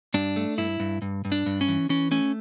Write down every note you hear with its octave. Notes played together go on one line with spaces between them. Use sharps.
G2 D4
A3
G2 E4
G2
G2
G2
D4
G2
C#4
E3
E3 C#4
A3 C#4